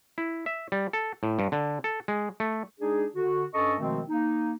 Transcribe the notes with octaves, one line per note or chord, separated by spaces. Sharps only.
E4
E5
G3
A4
A2
G2
D3
A4
G#3
A3
G#3 D4 D#4 G#4
D3 F#4
G2 C#4 A4 D#5 A5 C#6
B2 D#3 F3 G#3 A3 C4
A#3 D#4